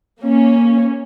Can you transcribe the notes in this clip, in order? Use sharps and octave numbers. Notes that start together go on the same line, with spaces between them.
A#3 C#4